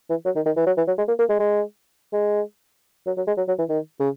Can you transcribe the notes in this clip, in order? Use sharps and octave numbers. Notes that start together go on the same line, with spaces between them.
E3
F#3
D#3
D#3
E3
F#3
E3
F#3
G#3
A#3
A#3
G#3
G#3
G#3
F#3
F#3
G#3
F#3
F#3
E3
D#3
C#3